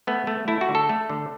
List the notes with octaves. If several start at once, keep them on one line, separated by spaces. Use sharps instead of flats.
A3 B3
A3
A3 E4
F#4
D3
A4
A3
D3